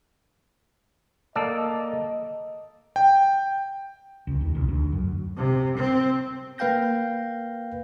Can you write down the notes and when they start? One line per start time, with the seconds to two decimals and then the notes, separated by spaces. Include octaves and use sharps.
1.36 A#3 A4 D5 D#5
2.96 G5
4.27 C#2
4.41 D#2
4.55 C2
4.68 D2
4.92 F#2
5.36 C3
5.77 C4
6.58 A#3 B4 F5 G5 G6 A#6